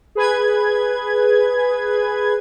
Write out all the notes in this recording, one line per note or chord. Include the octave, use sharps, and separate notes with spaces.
G#4 B4 G#6